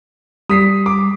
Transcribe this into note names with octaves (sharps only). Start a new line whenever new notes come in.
G3 D#6 B6 C7
D6